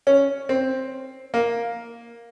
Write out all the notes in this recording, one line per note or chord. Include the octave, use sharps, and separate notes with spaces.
C#4
C4
A#3